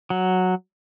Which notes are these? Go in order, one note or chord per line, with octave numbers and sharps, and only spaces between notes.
F#3